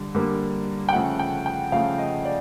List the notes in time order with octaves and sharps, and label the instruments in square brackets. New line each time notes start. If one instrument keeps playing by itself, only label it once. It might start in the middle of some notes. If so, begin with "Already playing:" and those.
Already playing: [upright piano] D3 G3
D3 G3 A#3
G5
C#3 F3 A3 F#5
G5
G5
C#3 F3 A3 F5
D#5
D5